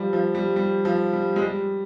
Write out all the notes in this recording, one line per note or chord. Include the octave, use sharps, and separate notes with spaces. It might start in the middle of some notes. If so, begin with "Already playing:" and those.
Already playing: F3 G3
F3
G3
G3
F3
G3
G#3
G3